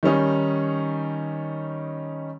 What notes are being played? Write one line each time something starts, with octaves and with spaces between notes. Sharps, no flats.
D#3 G3 C#4 D#4